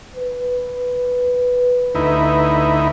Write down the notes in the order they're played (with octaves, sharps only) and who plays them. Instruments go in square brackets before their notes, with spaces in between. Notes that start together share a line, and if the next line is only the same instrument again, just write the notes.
[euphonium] B4
[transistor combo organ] D2 D#4 E4